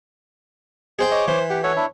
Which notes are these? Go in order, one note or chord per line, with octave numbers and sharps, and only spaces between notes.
G#4 C5 D#5 G5
C#5 D#5 D6
E3 C5
G4 F#5
F#4 A4 C#5 F#5
D4 E4 E5